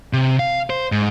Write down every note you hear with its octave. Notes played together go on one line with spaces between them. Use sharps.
C3
F5
C5
G#2